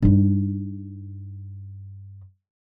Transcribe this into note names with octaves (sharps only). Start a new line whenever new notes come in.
G2 D#4